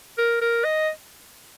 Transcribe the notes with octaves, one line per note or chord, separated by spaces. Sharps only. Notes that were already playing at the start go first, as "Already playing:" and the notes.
A#4
A#4
D#5